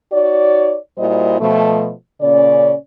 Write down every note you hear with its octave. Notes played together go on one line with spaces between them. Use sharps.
D#4 F#4 C#5 D5
A#2 G3 E4 F#4 C5 D#5
B2 F3 A3
A#2 C#3 C#4 D5